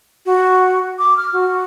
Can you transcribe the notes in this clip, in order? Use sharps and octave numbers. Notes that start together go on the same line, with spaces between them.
F#4
D6
F6
F#4